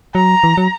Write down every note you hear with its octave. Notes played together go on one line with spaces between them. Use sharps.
F#3 A#5
E3
F#3